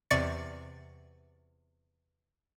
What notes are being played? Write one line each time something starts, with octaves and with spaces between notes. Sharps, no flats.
E2 C3 D5 C#6 A6 C#7